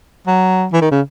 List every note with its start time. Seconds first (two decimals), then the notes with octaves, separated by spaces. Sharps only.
0.27 F#3
0.73 E3
0.82 D#3
0.91 C#3